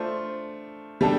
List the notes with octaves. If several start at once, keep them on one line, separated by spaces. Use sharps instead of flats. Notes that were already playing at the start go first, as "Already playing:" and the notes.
Already playing: A3 D4 F4 C5
G3 D4 A4